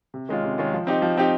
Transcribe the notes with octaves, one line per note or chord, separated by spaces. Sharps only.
C3
D#3 G#3 C#4 F4
C3
D#3 G#3 C#4 F4
F3
C4 D#4 G4
F3
C4 D#4 G4